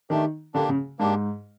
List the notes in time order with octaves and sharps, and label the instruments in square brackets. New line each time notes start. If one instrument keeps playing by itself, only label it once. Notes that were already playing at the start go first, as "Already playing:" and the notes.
[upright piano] D#3 [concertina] A3 D4 G4
[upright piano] D3 [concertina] A#3 D4 G4
[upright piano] C#3
[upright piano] G#2 [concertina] A#3 D4 G4